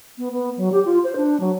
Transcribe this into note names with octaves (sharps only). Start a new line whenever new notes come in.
B3
B3
F#3
G4
F4
C5
D4
F#3